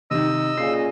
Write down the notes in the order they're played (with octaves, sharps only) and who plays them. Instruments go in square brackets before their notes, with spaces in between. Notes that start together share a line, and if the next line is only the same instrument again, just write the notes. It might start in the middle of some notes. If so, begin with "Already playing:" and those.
[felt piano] C3 D#3 [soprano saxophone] D#5 [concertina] E6
[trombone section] A#2 C#3 A#3 [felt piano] C7